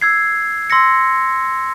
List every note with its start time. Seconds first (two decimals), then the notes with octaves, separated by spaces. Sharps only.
0.01 E6 G#6 C7
0.70 C6 E6 A#6 C#7